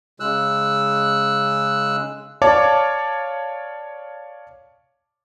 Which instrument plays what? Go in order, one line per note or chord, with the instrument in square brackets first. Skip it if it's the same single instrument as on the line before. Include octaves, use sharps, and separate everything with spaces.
[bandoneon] C#3 G#3 E6 F#6
[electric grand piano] C#5 D5 F5 A5 D6